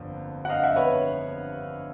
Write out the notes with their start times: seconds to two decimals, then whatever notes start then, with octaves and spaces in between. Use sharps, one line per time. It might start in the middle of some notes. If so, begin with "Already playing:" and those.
Already playing: G1 F2 D3 A#3
0.45 F#5
0.49 D#5 F5
0.63 E5 F#5
0.76 B4 C#5